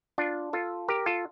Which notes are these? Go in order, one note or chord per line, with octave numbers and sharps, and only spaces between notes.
D4 F4
F4 A4
G4 A#4
F4 A4